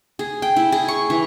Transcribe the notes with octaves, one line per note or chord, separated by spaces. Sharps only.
G#4
G5
E4
G#4
C#6
E3